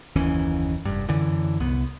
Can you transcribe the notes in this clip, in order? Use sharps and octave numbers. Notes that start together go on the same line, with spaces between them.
F#1 D#2 E3 C#4
F1 G2
F#2 D3 E3
C2 B3